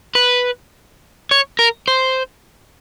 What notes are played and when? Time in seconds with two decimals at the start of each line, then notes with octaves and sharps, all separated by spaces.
0.15 B4
1.31 C#5
1.59 A#4
1.88 C5